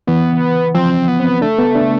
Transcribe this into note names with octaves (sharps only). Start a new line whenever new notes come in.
E3 B3
F3 C4
B3
C4
A3 D4
B3
D4